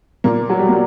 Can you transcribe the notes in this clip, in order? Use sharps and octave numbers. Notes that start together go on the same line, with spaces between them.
A#2 A#3
F#3
G3
A#3